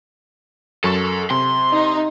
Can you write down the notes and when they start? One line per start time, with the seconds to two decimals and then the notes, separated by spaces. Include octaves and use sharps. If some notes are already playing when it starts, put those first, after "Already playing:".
0.84 F#2 F#3 A4 C#6
1.31 C3 C6
1.71 D#4